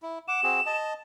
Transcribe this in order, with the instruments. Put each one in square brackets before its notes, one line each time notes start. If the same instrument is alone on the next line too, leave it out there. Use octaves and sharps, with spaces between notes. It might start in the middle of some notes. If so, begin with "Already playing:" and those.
[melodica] E4
[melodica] F#5 D6 [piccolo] E7
[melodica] C4 F#4 G#4
D#5 A5